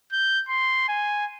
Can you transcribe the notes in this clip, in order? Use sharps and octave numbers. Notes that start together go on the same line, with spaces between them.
G6
C6
G#5